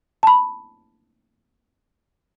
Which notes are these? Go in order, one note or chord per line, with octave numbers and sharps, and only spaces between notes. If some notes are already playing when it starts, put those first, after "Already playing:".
A5 B5